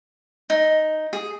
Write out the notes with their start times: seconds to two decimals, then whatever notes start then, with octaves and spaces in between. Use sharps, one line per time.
0.50 D#4
1.13 G#4